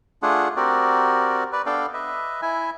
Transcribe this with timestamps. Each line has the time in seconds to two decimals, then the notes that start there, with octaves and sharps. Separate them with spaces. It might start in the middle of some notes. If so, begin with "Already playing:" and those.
0.23 A3 D4 F4 G#4 F#5
0.56 C4 F#4 G4 A#4 D5
1.53 B4 D5
1.66 B3 D4 A4 D5 F5 G5
1.94 B4 D#5 E5
2.42 E4 E5 G#5